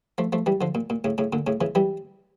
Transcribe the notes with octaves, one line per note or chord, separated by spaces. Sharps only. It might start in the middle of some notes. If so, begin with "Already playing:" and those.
F3 A3
F3 A3
E3 G3
D3 F3
A#2
A#2
A2 C#3
A2 C#3
A#2 D3
A2 C#3
C#3 E3
E3 G3